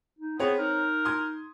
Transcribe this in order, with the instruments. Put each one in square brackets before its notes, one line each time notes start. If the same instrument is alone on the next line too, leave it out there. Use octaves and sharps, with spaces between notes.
[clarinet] D#4
[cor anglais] B3 [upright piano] C4 C#5 [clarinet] G#4
[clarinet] D#4 [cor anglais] A#4
[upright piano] C6 D#6 G#6